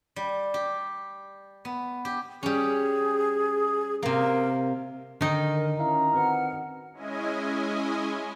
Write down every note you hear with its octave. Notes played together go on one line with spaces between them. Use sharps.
G3
G4
B3
G4
G3 C#4 G#4
C3 A#3 A#4
D3 D#3 D4 D#4 A#4 D5
C#4 E4 E5 F5 A#5
C4 F#4 B4 F#5 F6
G#3 C#4 E4 D#5 G#5